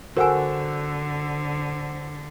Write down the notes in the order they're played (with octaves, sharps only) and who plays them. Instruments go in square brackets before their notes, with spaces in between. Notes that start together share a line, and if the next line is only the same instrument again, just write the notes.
[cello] D3 [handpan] F#4 A4 [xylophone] A#4 G#5 [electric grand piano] C5 F#5 E6